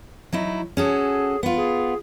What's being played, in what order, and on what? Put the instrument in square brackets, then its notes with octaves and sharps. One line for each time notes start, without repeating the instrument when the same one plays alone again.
[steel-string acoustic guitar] F#3 D#4 E4
[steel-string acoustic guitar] C#4 F#4 A4 [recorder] G#4
[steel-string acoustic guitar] B3 F4
[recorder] G#4